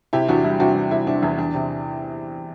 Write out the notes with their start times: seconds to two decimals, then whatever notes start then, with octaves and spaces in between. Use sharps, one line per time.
0.13 C3 E4 G4
0.28 E2 D4 F#4
0.44 G3 E4
0.60 C3 D4 F#4
0.75 E2
0.91 C3 E4
1.07 C3 D4
1.22 E2 E4
1.38 E2 D4
1.55 C3